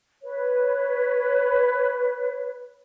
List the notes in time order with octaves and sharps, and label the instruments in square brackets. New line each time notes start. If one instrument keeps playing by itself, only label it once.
[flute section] B4 C#5